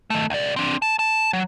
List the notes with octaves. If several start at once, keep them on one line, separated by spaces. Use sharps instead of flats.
D#3 A3
C#2 D5
C4 D4
A5
A5
F#3